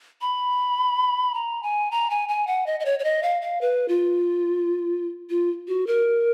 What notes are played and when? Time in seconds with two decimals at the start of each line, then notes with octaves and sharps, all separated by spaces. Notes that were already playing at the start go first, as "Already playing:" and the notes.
0.21 B5
1.34 A#5
1.63 G#5
1.91 A#5
2.10 G#5
2.29 G#5
2.47 F#5
2.66 D#5
2.80 D#5
2.85 C#5
2.99 C#5
3.04 D#5
3.23 F5
3.42 F5
3.61 B4
3.88 F4
5.30 F4
5.68 F#4
5.87 A#4